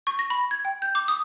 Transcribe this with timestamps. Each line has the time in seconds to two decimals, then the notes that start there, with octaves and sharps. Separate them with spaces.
0.07 C#6
0.19 A#6
0.30 B5
0.51 G#6
0.65 G5
0.82 G6
0.95 D6
1.08 D#6